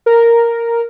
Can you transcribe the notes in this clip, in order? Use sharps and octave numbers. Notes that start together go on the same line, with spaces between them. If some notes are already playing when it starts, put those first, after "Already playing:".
A#4